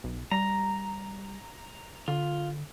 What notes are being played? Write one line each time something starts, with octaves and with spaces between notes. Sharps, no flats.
B1
G3 A#5
D3 F4